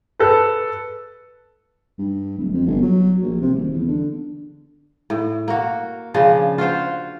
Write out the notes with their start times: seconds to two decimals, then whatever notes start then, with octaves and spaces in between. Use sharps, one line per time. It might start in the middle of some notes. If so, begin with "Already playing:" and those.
0.20 A4 B4
1.99 G2
2.38 D1
2.53 F2
2.67 G1
2.82 F#3
3.22 A#1
3.41 C3
3.54 D#1
3.73 E2
3.88 D3
5.10 A2
5.48 A#3 F#4
6.14 C#3 F3 D4
6.58 F4 F#4 C5 F5